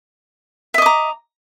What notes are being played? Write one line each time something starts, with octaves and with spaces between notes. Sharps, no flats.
D#5 E5 A#5 D6